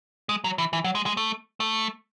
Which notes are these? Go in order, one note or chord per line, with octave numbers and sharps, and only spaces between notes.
G#3
F#3
E3
E3
F#3
G#3
G#3
A3
A3